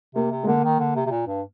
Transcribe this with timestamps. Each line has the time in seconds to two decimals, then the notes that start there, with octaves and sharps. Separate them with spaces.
0.15 C3 A#3
0.31 C3
0.43 G#3
0.47 D3 A#3
0.64 D#3
0.79 D3
0.96 C3
1.06 C3
1.11 A#2
1.27 G2